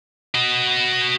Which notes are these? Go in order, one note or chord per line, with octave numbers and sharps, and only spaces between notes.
F#4 D#5